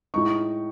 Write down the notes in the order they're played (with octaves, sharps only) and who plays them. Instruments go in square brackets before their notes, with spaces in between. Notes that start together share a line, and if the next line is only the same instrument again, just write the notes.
[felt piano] A2 G#3 D#4 C#6